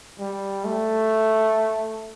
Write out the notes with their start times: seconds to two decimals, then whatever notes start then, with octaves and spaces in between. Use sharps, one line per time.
0.19 G3
0.65 A3